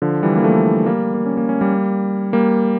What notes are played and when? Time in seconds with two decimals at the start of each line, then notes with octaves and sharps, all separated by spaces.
0.02 D3 F3
0.23 E3 G3
0.36 A#3
0.44 F3 A3
0.86 G3 A#3
1.14 A#3
1.26 C#4
1.37 A#3
1.49 C#4
1.61 G3 A#3
2.33 G3 A#3